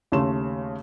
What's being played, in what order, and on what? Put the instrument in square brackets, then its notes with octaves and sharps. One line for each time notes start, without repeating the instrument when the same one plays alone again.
[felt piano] D#2 C#3 A3 C6 E7